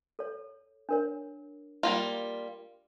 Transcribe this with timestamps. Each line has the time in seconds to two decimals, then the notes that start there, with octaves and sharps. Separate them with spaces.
0.19 A4 C#5
0.89 D4 A#4 C#5
1.83 G3 A#3 F4